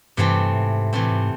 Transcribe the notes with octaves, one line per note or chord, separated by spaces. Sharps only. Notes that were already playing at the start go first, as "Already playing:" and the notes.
G2 C3 E3 A3 C4
G#2
A2 C3 E3 A3 C4
G#2